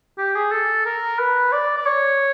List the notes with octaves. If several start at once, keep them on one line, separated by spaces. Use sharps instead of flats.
G4
G#4
A4
A#4
B4
D5
D5
C#5